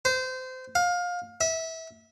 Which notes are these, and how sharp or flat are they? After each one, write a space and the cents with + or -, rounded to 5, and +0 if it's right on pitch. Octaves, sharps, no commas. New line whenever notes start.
C5 -25
F5 +25
E5 -25